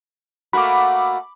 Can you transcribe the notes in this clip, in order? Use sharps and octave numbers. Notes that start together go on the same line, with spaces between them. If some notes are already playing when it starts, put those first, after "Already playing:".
A3 A#3 F#4 B5 D6